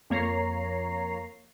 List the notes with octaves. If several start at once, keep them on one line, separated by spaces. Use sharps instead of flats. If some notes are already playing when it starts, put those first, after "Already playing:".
F2 A#3 C#5 A#5 C7